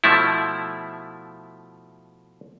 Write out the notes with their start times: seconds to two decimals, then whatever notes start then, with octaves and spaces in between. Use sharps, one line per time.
0.04 B2 F3 A3 E4